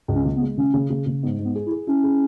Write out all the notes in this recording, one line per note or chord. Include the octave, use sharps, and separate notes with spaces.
C#2
C#4
C#3
B3
G#3
C#3 C#4
C#3
C#3
C#3
G#2 B3
G#2
B3
G#4
E4
G#4
C#4 E4
G#4